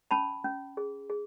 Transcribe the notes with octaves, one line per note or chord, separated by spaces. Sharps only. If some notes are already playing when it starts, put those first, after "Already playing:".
C#4 A5 B5
C#4
G#4
G#4